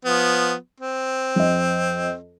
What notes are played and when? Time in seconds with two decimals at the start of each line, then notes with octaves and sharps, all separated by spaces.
0.05 F3 B3
0.80 C4
1.36 F2 D#5